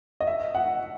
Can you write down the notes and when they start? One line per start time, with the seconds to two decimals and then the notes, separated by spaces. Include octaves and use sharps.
0.20 D#5
0.27 E5
0.55 F#5